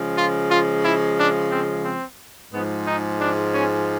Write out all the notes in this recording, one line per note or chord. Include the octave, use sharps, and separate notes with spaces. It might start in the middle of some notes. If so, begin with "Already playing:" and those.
Already playing: C#3 F3 G#3
F4
F4
E4
D4
C4
C4
G#2 F3 G#3 B3
D#4
D4
C#4